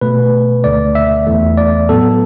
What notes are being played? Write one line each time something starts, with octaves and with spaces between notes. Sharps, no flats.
B2 A3 B4
D2 D3 A3 D5
E5
E2 E3 A3
D5
A2 F#3 B3 A4